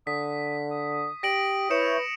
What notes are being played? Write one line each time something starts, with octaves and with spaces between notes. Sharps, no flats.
D3 D#6 B6
D#6
G4 A#6 D7 F#7
E4 B4 C#5 D#6 G6 C#7 E7